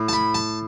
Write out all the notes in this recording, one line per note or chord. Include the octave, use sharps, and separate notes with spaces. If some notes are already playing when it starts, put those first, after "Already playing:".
Already playing: A2
A5
B5
A5